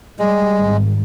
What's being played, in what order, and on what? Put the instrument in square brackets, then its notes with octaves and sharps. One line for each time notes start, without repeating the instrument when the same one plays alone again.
[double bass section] G3 [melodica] G#3
[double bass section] G#1